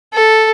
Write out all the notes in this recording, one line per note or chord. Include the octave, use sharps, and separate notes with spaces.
A4